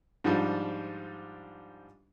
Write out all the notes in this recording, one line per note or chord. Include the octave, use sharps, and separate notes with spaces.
G#2 F3 G3 D4